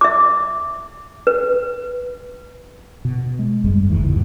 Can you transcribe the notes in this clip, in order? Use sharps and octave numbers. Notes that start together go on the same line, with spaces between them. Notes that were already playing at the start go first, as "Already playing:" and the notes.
E5 D6
B4
B2
G#3
G#1 F#2 G3 G#3
F#1 D#2 B2 E3
C#2 G2 B2